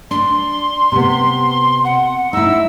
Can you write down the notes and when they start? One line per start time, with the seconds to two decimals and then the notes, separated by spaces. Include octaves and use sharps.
0.11 D4 C6
0.92 C3 B3
1.85 F#5
2.33 D#4 E4 E6